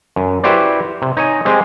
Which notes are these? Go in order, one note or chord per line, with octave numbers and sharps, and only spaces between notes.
F#2
E4 F#4 G4 B4 C5 D5
C3
D#4 C#5 D#5 G#5
G#3 C4 G4 G#4